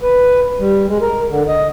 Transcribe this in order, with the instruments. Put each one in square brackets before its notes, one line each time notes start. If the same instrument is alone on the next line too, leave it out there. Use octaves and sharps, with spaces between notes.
[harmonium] B4
G3
G#3
A#4
D3
D#5